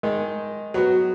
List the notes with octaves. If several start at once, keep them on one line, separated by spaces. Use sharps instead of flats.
D#3 G#3 D#4
F#3 B3 F#4